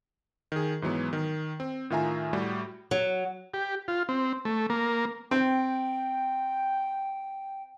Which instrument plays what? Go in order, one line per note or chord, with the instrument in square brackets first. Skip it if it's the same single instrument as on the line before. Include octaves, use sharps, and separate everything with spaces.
[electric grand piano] D#3 G#4
G#2 E3 F#3 B3
D#3
C4
A2 D#3 F4 E5 G#5 A#5
A2 G3 F#4 G4
[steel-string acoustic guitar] F#3
[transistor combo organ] G4
F4
C4
A3
A#3
[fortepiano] C4 [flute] G5